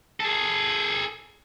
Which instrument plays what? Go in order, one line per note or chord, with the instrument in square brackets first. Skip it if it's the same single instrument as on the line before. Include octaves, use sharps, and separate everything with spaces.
[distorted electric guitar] G#4 A4